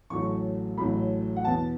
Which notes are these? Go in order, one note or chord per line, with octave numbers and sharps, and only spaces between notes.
A1 A2 F#3 A3 C#6
A1 A2 F#3 A3 B5
F#5
E2 B2 B3 A5